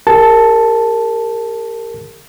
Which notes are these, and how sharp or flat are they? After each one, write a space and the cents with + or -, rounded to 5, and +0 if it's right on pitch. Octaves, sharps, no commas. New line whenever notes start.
G4 +45 A#4 -20 A5 +0